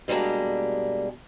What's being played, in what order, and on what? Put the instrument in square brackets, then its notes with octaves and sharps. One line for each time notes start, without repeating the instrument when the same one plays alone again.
[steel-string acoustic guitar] B2 G3 G#3 A#3 D4